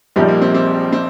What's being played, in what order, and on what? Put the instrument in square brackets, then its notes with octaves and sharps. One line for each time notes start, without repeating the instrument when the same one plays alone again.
[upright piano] A#1 A#2 F3 D#4 G4 [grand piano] G3
[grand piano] A#3
C4
C4
C4